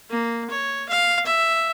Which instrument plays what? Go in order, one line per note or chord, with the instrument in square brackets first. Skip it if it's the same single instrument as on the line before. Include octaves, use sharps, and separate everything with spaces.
[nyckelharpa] A#3
C#5
F5
E5